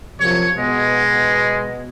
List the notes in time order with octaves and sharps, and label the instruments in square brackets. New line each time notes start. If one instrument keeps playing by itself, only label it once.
[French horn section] F#2 C3 F3 [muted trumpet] C#5
[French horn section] B2 [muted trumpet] G#3